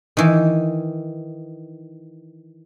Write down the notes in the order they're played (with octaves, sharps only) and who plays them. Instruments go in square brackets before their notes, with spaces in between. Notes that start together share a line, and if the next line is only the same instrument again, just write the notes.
[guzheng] D#3 E3